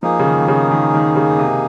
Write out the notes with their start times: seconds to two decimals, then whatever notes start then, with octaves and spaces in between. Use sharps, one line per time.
0.02 F3 A#3 D#4 G#4
0.19 C#3
0.25 D#3
0.41 D#3
0.48 C#3
0.71 D#3
0.94 D#3
1.16 C#3
1.39 C3